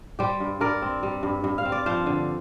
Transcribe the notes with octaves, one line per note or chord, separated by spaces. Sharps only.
G3 G4 C5
G2
G2 A#4 D5
C4
G3
G2
G2
F5
C4
D5
F3 C5 F5
D3